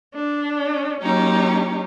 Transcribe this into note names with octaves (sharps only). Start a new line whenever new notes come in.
D4
F#3 A#3 C#4 D#4 G4